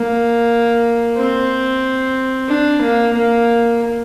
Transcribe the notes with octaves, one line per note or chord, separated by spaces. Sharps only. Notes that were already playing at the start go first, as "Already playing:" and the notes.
Already playing: A#3
C4
D4
A#3
A#3